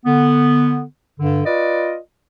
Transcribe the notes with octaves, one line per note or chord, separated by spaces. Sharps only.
D3 B3
G2 D3
F4 B4 D5 D#5